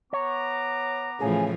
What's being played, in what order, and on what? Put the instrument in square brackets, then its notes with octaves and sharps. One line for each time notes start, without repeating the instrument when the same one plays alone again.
[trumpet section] B3 A#5 D6 [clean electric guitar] C#5
[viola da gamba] A2 E3 F3 [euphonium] C#3 [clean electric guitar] G#4